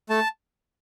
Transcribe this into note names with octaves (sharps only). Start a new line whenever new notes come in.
A3 A5